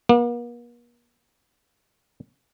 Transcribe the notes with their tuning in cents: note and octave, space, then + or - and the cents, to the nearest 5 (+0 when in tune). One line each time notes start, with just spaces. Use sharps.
A#3 +45